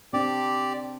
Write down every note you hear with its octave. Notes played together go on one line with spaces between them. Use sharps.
C4 D4 G4 D5